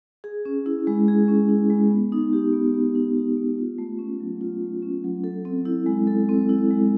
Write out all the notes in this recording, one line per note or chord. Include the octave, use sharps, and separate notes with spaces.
G#4
C#4
E4
G#3
G#4
C#4
E4
G#3
B3
D#4
G4
B3
B3
D#4
G4
B3
F4
A3
C#4
F#3
F4
A3
C#4
F#3
A4
C4
E4
G#3
A4
C4
E4
G#3